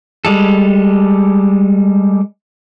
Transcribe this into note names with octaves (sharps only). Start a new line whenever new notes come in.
G3 G#3 A4